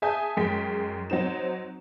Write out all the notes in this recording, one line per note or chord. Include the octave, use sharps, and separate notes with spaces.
G#4 E5 G#5 A5 D#6 G6
F#2 G#3 G5 B6
F#3 C4 D#4 E7